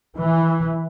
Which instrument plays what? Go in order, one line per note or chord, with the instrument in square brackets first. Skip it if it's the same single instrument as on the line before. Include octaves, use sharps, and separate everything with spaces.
[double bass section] E3